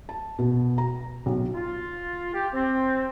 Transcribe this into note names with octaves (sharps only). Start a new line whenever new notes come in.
A5
B2
A#5
B1
F4
G4
C4